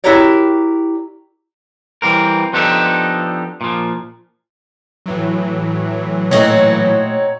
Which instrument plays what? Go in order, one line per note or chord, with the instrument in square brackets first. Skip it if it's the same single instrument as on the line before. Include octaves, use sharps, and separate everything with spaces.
[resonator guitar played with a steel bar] E4 F#4 G4 A#4 C#5 D5
[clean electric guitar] E3 G3 C4 A#4
F3 B3 D4 D#4 G4 A4
A#2 F3
[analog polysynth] A2 E3 F#3
[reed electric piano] A#2 A3 [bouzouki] C4 D#4 F#4 [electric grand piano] C#5